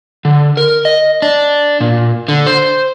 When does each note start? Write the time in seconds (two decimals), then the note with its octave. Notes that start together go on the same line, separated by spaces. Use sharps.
0.25 D3
0.57 A#4
0.85 D#5
1.22 D4
1.81 A#2
2.28 D3
2.46 C5